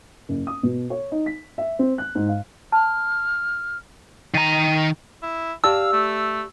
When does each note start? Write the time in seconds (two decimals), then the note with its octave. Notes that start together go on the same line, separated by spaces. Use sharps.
0.29 F#1
0.47 D#6
0.63 B2
0.90 C#5
1.12 D#4
1.26 B6
1.58 E5
1.79 C4
1.98 F#6
2.15 G#2
2.28 F5
2.72 A5 F6
4.34 D#3 A#5 D#7
5.22 E4
5.64 G4 D5 F5 A5 E6
5.92 A3